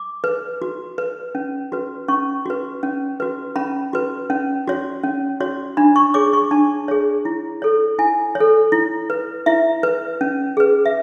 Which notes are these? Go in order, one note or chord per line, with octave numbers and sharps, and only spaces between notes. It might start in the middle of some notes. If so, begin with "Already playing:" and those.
Already playing: D6
B4
F#4
B4
C#4
F#4 B4
C#4 C#6
F#4 B4
C#4
F#4 B4
C#4 B5
F#4 B4
C#4
F#4 C#5
C#4
F#4 C#5
D4 B5
C#6
G#4 C#5 D6
C#6
D4 A5
G#4 C#5
E4
A4 C#5
E4 G#5
C#5
A4
E4
B4
E4 E5
B4
C#4
G#4 B4
E5